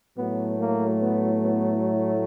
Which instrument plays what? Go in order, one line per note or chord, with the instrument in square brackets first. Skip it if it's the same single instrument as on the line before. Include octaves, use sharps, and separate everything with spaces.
[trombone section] A2 F#3 A3 B3
A#3
B3
B3